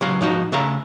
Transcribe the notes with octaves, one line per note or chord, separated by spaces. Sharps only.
C#2 F#3 F5
G#2 F3 D#4 F#4
C#3 A3 E5 F5 A#5